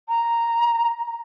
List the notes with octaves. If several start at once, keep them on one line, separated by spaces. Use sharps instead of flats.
A#5